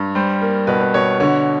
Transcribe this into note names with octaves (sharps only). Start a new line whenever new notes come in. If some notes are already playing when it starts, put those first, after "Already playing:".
Already playing: G2
G3 C5
A#3
B2 B4
B4
B2 C#5
D3 C#5